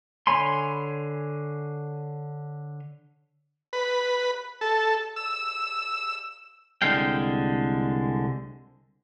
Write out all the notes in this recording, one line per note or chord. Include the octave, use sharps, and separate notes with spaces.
D3 C#5 G#5 B5 C6
B4
A4
E6
C2 D3 G#3 F5 G5